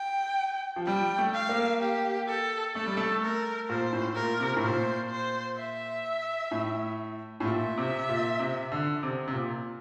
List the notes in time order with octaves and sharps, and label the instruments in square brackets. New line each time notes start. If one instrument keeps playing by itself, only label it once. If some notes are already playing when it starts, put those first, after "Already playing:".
Already playing: [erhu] G5
[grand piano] F3
[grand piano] G3 [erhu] G5
[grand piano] A3
[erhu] F5
[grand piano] A#3
[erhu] G4
A4
[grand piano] A3 [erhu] A4
[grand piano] G3
A3
[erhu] A#4
[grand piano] A#2 [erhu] C5
[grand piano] A2
[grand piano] A#2 [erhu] A#4
[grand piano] C3
A2
[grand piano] A#2 [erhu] C5
[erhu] C5
E5
[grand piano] A2
A2
[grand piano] A#2 [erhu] E5
[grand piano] C3
A#2
C3
D3
C3
C3
A#2